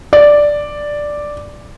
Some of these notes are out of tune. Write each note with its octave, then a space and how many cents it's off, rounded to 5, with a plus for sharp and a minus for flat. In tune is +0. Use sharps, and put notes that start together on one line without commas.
D5 +0